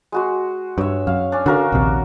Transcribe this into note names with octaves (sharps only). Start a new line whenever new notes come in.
G#3 F#4 C6
G2 C#5 E5
F#2 F5
C#4 D4
D3 F#4 A#4 F5
A#1 D#2 C3